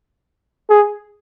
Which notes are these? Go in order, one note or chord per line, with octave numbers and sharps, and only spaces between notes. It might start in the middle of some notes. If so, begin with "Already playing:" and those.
G#4